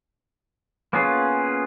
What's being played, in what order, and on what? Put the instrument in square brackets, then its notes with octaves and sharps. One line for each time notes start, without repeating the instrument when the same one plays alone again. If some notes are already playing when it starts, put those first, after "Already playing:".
[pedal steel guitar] A#3 B3 C#4 F4 G#4